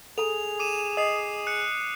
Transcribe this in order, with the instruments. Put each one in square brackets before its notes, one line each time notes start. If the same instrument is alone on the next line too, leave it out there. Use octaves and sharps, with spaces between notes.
[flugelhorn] G#4 [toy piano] A4 A#5 [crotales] F7
[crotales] D6 D#7 E7
[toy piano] D#5 [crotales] D#6 C7
[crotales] F#6 C#7